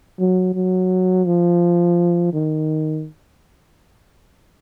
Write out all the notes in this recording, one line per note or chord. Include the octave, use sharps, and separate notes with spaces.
F#3
F#3
F3
D#3